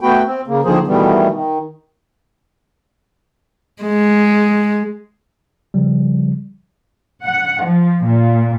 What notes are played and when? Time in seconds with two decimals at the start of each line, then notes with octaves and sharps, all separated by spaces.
0.01 A3 B3 F#4 B4 G5
0.26 C4
0.47 C#3 A#3
0.65 D3 D#3 F3 A#3 G#4 C5
0.87 B2 D#3 E3 G3 A3 B3
1.32 D#3
3.82 G#3
5.74 C#3 F3 G3
7.25 F#5
7.65 F3
8.05 A#2